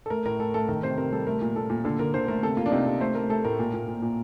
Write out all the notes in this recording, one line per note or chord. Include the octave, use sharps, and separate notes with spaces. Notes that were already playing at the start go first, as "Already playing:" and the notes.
A4
A3 A#4
A2 A#4
A3 A4
A3 A4
D#3 A#4
C3 C5
C3 A#4
G3 A4
A3 A#4
A#2
A#2 A4
A#2
D3 A4
D3 A#4
D3 C5
A3 A#4
C3 A4
A#3 F4
D4
C3 D#4
C3
A3 C5
A3 A#4
A3 A4
A2 A#4
A#2
A#2
A#2
A#2